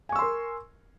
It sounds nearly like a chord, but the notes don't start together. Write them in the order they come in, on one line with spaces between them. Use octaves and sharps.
G#5 C#6 E6 C6 A#4